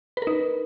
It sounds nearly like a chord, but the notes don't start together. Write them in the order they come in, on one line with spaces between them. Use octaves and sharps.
B4 A#4 D#4